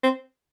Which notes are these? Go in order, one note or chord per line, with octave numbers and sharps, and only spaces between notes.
C4